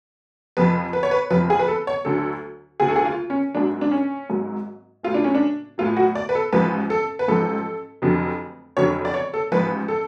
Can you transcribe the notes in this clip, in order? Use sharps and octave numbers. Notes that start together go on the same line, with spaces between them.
F1 F2 F3 B4
B4
C#5
B4
F1 F2 F3 B4
G#4
B4
A4
C#5
D2 D3 F#3 A4
D2 D3 F#3 G#4
A4
G#4
F4
C#4
G#1 G#2 F#3 D4
D4
C#4
G#1 G#2 F#3
B1 A2 F#3 F4
D4
C#4
D4
B1 A2 F#3 F4
F#4
D5
B4
A4
A1 G#2 F3 B4
A4
B4
A1 G#2 F3 A4
F1 F2 D3 F#3
F1 F2 D3 F#3 C#5
D5
C#5
A4
A1 G#2 F3 B4
A4